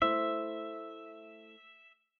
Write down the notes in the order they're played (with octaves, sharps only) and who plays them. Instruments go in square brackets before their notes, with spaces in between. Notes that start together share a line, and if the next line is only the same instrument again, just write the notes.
[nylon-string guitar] A3 E4 C5 [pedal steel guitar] E5